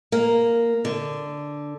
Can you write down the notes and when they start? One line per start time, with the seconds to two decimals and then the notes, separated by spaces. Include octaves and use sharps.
0.12 A#3
0.85 D3